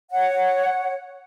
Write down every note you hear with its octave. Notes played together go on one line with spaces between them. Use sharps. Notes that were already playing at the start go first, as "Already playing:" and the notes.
C#5 F#5